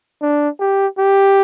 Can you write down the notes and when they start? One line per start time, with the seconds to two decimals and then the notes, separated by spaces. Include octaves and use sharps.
0.22 D4
0.60 G4
0.99 G4